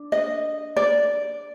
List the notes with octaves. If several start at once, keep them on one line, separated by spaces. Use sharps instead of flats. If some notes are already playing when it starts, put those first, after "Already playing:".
Already playing: D4
D#5
D5